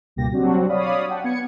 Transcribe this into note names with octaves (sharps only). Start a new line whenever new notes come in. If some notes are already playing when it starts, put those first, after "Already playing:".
C#2 G2 B2 A#3 G4 A#6
F#3 G3 C4 D4 F#4
C#5 D5 F5 B5 D#6
F#5 G5 A5
B3 G#6 C#7